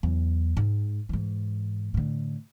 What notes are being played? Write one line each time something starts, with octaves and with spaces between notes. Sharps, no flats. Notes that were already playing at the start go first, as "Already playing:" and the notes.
E2 F#3
G#2
G#2 E3
A2 D3